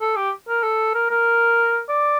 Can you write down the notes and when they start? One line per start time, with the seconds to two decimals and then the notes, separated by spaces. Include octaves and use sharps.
0.01 A4
0.16 G4
0.48 A#4
0.63 A4
0.94 A#4
1.11 A#4
1.89 D5